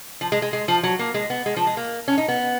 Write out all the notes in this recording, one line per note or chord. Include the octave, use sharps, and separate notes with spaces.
F3
G#3
G#3
G#3
F3
F#3
A#3
G#3
B3
G#3
F3
G#3
A#3
C#4
D#4
B3